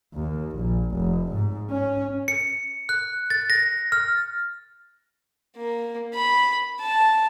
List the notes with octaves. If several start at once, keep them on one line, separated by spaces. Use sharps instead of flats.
D#2
A#1
F1
G#2
C#4
C#7
F#6
A6
A#6
F6
A#3
B5
A5